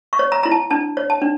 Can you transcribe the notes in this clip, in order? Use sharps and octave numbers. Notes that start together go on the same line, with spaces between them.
C#6
C#5
A#5
E4 A#5
A5
D4 A5
C#5
A5
D4